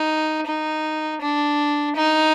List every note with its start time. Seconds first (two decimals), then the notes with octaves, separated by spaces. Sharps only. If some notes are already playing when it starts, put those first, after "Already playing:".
Already playing: D#4
0.47 D#4
1.21 D4
1.96 D#4